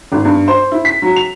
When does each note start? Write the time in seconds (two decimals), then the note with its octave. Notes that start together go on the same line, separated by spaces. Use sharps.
0.12 G#1
0.25 G2
0.48 C5
0.72 E4
0.85 B6
1.02 F#3
1.16 F7